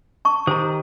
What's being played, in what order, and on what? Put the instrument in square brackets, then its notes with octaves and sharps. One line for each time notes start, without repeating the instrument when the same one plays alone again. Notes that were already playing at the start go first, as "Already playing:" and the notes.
[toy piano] A5 C#6
[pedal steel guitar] D#3 G4 D#6 [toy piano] C5 A#5